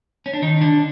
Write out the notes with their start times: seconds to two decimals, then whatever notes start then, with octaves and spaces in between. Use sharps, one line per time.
0.26 C#4
0.34 D4
0.42 D#3 D#4
0.61 D3 D4